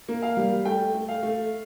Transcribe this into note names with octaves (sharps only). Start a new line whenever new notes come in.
A#3
F5
G3
A3 G5
A3
F5
A3